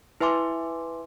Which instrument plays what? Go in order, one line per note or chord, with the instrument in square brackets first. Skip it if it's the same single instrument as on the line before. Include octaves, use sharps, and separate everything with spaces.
[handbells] E4 B4 E5 G#5 C6 D6